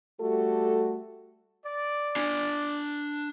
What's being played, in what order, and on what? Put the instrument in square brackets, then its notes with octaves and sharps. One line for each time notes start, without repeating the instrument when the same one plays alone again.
[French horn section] G3 A3 F#4 G4 A4
[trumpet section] D5
[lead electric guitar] D4 G#5